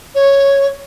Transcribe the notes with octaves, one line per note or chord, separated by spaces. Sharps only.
C#5